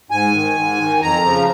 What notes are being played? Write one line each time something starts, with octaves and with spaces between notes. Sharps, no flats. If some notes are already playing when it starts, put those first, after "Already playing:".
G#2 G#5
D#3
G#2
D#3
F2 A#5
C#3 F3